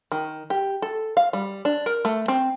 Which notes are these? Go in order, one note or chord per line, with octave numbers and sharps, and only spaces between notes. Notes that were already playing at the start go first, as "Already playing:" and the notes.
D#3
G4
A4
F5
G3
D4
A#4
A3
C4